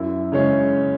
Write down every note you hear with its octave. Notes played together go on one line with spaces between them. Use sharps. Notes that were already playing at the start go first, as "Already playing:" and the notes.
Already playing: F#2 E4
C#3 G#3 C#4